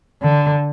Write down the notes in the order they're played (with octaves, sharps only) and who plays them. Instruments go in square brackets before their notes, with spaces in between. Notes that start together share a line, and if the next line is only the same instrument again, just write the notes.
[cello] D3